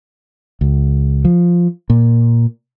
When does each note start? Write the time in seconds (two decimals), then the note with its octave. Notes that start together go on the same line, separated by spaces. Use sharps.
0.61 C#2
1.25 F3
1.90 A#2